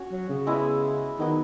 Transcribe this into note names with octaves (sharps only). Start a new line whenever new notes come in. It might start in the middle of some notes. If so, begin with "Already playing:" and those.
Already playing: C#4 F#4 C#5
F#3
C#3
G#3 B3 E4
D#3 F#3 B3 D#4